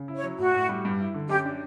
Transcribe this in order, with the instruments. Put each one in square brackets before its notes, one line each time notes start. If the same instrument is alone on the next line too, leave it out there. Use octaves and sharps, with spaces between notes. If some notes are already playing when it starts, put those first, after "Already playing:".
Already playing: [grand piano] C#3
E4
[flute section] C#5
[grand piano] F#3
[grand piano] A2 [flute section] F#4
[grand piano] A2
G3
G2
E4
D3
[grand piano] F#2 [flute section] G4
[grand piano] D4